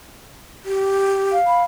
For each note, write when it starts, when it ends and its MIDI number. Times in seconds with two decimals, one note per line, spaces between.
0.65 1.35 67
1.32 1.64 77
1.47 1.62 83